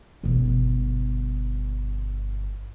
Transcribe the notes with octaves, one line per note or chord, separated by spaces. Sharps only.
G1 B2